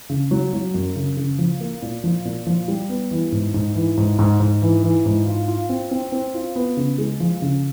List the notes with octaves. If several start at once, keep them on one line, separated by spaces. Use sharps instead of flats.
C#3
F#3
F#3
F#2
C#3
C#3
F3
A#3
A#2
F3
A#2
F3
G3
B3
E3
G#2
G#2
E3
G#2
G#2
G#2
E3
E3
G#2
F4
F4
C4
C4
C4
F4
B3
C#3
G#3
F3
C#3